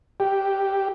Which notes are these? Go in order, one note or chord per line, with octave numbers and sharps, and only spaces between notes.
G4